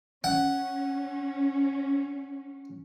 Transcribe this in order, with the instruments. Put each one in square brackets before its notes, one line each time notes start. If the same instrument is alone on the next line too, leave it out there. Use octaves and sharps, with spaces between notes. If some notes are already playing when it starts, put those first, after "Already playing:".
[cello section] C#4 [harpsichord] F#5